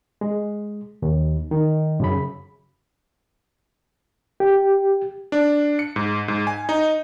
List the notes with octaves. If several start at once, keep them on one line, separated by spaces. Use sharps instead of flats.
G#3
D#2
D#3
F#2 C#3 B5
G4
D4
C#7
G#2
G#2
G#5
D#4